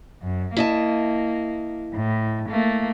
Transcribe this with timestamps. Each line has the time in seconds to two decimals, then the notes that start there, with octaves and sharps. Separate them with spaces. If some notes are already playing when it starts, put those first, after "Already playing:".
0.23 F#2
0.57 A#3 E4 D#5 A5
1.94 A2
2.49 A3 A#3